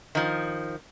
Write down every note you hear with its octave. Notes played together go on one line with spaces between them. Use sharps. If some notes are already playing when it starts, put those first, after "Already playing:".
D#3 F3